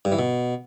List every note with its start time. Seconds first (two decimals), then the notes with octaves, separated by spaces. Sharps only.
0.05 G2
0.12 E3
0.19 B2